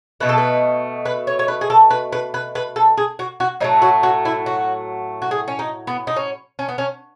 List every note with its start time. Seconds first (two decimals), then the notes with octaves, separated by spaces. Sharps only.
0.20 B2 A3 B4
0.29 A4
0.38 B4
1.05 B4
1.27 C#5
1.39 C#5
1.48 B4
1.61 G#4
1.70 A4
1.90 B4
2.12 B4
2.34 B4
2.55 B4
2.76 A4
2.97 G#4
3.19 F#4
3.40 F#4
3.60 A2 F#3 A3 D#4
3.82 F#4
4.03 F#4
4.25 E4
4.46 F#4
5.22 F#4
5.31 G#4
5.48 C#4
5.59 D#4
5.87 B3
6.07 D#4
6.16 C#4
6.59 C#4
6.69 B3
6.78 C#4